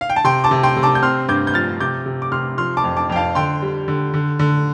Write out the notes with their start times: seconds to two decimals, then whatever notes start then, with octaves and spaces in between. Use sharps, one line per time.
0.01 F5
0.10 G5
0.16 A5
0.24 C3 G5 C6
0.44 A5 D6
0.51 C3
0.63 G5 C6
0.77 C3
0.83 A5 D6
0.95 G6
1.02 C4 C6 F6
1.28 G2 D6 G6
1.47 G6
1.54 F3 F6 A6
1.80 C3 D6 G6
2.06 C3
2.22 D6
2.32 C3 C6 F6
2.58 F3 C6 F6
2.77 A5 D6
2.84 F2
2.97 A5 D6
3.09 F2 G5
3.16 F5 A5
3.35 D3 G5 C6
3.62 G3
3.88 D3
4.14 D3
4.39 D3